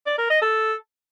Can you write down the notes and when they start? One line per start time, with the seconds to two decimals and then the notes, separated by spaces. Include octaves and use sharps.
0.07 D5
0.18 A#4
0.30 D#5
0.42 A4